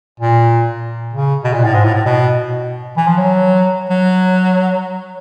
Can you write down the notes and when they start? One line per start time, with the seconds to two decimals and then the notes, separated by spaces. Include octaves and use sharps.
0.20 A#2
1.13 C#3
1.44 B2
1.53 A#2
1.64 A2
1.74 G#2
1.84 A2
1.94 A2
2.05 B2
2.97 E3
3.07 F3
3.17 F#3
3.90 F#3